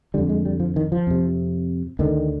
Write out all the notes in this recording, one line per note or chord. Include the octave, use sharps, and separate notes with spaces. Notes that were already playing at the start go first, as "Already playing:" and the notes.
F2 D3 G3
G#3
G3
F3
D#3
F3
F2 C3
D2 D3 D#3